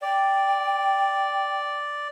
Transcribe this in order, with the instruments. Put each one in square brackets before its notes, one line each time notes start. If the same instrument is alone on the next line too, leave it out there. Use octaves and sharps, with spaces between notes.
[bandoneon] D5 [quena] G5